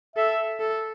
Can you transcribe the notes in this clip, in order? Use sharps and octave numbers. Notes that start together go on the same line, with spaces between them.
A4 E5
A4